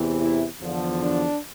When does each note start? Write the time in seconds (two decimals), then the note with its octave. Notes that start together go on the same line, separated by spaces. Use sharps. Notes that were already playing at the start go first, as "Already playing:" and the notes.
Already playing: E2 C3 E3
0.21 E4
0.61 E2 D3 F3
1.02 D4